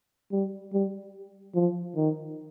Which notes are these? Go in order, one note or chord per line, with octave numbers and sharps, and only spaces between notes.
G3
G3
F3
D#3